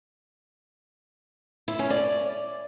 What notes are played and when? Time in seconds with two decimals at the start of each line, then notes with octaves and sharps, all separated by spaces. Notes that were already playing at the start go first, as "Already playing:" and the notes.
1.68 E4
1.79 C#4
1.90 D5